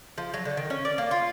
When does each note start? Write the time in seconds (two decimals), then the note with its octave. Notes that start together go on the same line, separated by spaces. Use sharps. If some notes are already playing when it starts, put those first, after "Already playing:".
0.18 F3
0.34 F#3
0.45 D3
0.57 D#3
0.70 C#4
0.85 D5
0.98 A#3
1.11 F4